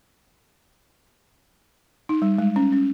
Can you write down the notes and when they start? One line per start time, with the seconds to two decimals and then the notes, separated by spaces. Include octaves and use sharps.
2.09 D#4
2.22 G3
2.38 G#3
2.56 C#4
2.72 C#4